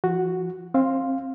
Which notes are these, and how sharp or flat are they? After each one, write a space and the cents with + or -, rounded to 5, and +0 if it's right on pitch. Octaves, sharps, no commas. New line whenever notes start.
F3 -40 F#4 +0
C4 +25 F5 +0 C6 +0